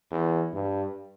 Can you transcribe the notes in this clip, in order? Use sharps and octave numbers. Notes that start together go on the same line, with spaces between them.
E2
G2